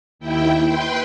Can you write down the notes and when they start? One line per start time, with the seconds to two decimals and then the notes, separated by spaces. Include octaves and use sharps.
0.19 D#2 E4 G5
0.67 B4 G5 C6